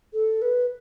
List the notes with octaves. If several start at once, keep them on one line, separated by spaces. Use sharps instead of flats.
A4
B4